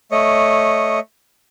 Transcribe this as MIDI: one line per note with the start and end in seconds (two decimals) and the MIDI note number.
0.12 1.00 57
0.12 1.00 73
0.12 1.00 75